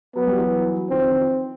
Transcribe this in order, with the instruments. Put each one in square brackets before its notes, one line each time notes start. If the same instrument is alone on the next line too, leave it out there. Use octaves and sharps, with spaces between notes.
[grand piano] F#3 [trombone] B3
[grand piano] G3
E3 F#3
[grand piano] D#3 F3 [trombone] C4
[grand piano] D#3 F3